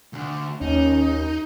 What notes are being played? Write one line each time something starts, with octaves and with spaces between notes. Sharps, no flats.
D2 D3
D#2 C#4 D#4